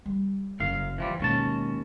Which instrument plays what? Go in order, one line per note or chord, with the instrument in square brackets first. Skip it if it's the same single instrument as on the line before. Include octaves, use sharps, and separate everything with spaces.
[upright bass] G3
[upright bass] F#1 [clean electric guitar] F#2 F5
[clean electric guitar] E3 F3 G3
[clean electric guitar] D#2 C#4 A5 [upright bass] B2 G#3